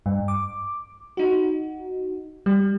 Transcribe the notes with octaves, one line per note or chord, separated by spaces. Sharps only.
G2
D6
D#4 F#4
G3